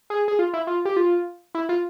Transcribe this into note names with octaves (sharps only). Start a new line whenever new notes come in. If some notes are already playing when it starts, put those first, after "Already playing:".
G#4
G#4
F4
E4
F4
G4
F4
E4
F4